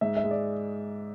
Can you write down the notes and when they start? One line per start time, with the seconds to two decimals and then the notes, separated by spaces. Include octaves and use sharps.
0.01 G#2 E5
0.17 E5
0.24 G#3
0.31 D5